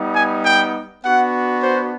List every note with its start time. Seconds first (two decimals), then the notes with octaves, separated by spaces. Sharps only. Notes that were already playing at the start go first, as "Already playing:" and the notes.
Already playing: G3 B3 D#4
0.15 G#5
0.44 G5
1.03 B3 D4 F#4 F#5
1.63 C5